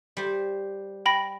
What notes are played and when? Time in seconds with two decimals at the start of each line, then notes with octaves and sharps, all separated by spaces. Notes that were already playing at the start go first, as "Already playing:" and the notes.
0.17 G3 C5
1.06 G5 B5 A#6